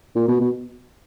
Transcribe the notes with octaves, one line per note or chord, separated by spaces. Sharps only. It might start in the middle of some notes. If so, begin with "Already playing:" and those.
A#2
B2
B2